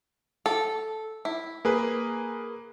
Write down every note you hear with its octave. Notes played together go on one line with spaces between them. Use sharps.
A4
E4
A#3 G#4 B4